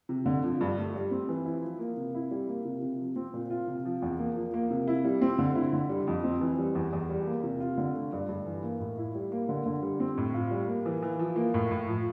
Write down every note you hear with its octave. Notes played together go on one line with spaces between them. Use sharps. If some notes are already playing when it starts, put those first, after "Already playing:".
C3
D3
F3
G2
A3
G3
C4
E3
E4
F3
A#3
C3
E4
G3
A#3
C3
C3
F3
C4
A#2
F4
C3
F3
E2
A#3
F3
A#3
C3
E4
G3
C4
D3
E4
D3
G3
F2
C4
E3
G3
E2
E2
G3
A#3
C3
F4
D3
A3
G2
G2
E3
A#3
A2
E4
G3
A#3
D3
D3
G3
C4
A2
F4
G3
A#3
E3
E3
F3
A#3
A2
A2
F3